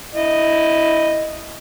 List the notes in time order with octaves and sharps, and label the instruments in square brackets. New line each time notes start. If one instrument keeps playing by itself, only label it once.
[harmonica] E4 D#5